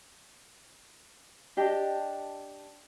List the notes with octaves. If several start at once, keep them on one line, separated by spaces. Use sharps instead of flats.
D4 G4 D#5 A5